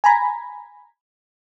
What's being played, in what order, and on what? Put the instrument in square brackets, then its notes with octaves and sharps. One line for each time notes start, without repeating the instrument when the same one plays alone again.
[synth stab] G#5 A#5 B5